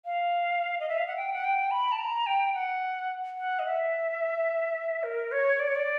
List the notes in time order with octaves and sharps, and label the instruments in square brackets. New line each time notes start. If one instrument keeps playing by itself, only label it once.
[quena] F5
D#5
E5
F5
F#5
G5
F#5
G5
B5
A5
A#5
G5
F#5
F#5
D#5
E5
A#4
C#5
D5
C#5
D5